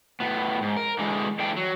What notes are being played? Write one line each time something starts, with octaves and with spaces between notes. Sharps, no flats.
A2 B3
G#2
A#4
D3 E3 G#3
E3 G#3 A3 D4 G5
F#3